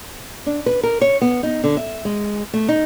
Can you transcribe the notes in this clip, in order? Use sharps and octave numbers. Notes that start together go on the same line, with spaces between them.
D4
B4
A#4
C#5
B3
D#4
D3
E5
G#3
A3
D#4